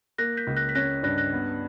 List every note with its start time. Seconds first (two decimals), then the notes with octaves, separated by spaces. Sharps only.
0.18 A#3 F#6 A#6
0.37 G6 B6
0.47 C#2
0.56 F#6 A#6
0.69 B6
0.75 C#4 F#6 A#6
1.03 G2 F#6 A#6
1.18 F#6 A#6
1.33 B3